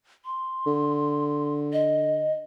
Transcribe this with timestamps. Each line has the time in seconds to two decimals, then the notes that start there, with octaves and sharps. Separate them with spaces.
0.25 C6
0.66 D3
1.73 D#5